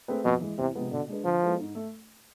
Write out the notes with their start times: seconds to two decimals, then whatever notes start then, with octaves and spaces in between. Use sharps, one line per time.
0.08 A3 C4 G#4 B4
0.25 F2 B2
0.41 E3 G#3
0.58 E2 C3
0.75 C3 F3 G#3 B3
0.92 B2 D3
1.08 G#3 D4 G#4 B4
1.25 D3 F3
1.42 G#3 B3 E4 A4
1.59 G#2
1.75 A3